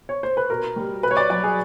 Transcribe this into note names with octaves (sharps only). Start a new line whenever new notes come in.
C#5
C5
B4
B2 A#4
G3
B2 B4
C#5
D5
F#3 D5
G#4